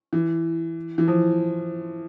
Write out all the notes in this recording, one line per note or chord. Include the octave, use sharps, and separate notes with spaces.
E3
E3
F3